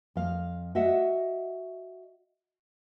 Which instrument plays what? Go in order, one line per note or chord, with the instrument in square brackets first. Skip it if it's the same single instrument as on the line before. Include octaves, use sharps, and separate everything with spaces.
[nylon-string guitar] F2 F5
F#4 D#5 E5 F#5